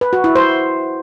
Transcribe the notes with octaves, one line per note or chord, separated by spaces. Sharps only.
B4
F#4
E4
C5